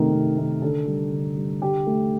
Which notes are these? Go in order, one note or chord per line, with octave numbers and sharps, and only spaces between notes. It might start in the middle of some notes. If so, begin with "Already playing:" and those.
Already playing: C3 D#3 A3 A#4
C3
D#3 A3
D3 A4
G3
D3
G3
D3 G4
A3